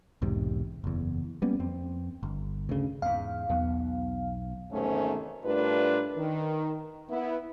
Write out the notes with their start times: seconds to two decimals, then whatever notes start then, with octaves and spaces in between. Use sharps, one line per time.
0.22 B1 E2 G#2 C3
0.84 F#1 E2
1.42 G3 A#3 B3 C#4
1.59 F2 C4
2.23 G1
2.69 D2 C#3
3.02 E2 G#2 F5
3.50 B1 E2 B3
4.71 E2 G#2 C3 D#3 A3 C#4
5.44 A2 G3 D4 F4 A#4 B4
6.17 D#3
7.10 B3 E4